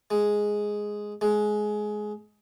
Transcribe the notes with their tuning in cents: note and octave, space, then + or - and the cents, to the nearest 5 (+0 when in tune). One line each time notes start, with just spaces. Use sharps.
G#3 +0
G#3 +15